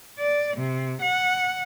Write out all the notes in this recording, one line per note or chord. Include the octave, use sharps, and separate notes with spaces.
D5
C3
F#5